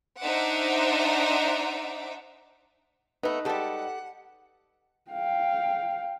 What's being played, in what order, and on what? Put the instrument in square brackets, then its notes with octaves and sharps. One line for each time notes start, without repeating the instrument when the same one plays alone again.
[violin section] D4 D#4 C5 E5 F#5 D6
[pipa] A3 B3 [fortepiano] D#4 B4
[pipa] G3 G#3 [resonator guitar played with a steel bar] G4 A4 [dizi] F#5
[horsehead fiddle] F5 G5